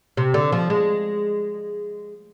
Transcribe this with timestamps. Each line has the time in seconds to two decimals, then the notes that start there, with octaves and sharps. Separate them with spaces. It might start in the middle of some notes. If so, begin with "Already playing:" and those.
0.17 C3
0.34 D3
0.52 F3
0.70 G#3